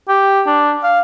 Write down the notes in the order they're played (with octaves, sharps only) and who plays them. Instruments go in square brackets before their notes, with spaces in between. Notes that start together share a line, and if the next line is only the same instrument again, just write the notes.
[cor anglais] G4
D4
F5